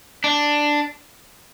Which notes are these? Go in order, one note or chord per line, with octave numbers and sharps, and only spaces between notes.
D4